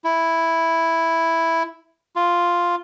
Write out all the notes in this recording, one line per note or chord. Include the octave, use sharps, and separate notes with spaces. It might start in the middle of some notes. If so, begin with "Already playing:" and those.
E4
F4